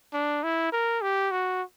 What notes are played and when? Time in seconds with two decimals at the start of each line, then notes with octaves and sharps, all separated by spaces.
0.13 D4
0.43 E4
0.72 A#4
1.01 G4
1.31 F#4